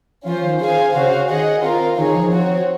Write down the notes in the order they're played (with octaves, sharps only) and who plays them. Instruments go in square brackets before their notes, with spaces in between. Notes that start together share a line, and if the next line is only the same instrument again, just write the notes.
[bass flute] F3 [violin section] C#4 F4 C5
[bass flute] D#3
[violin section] G#4 C5 F5 G#5
[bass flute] C#3 [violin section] C#4 F#4 C5 F5
[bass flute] D#3 [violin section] G#4 D#5 F#5
[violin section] C4 F4 A#4 F5
[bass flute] D#3 [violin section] D#4 G#4 C#5
[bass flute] D#3
F3
[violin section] C4 F#4 C#5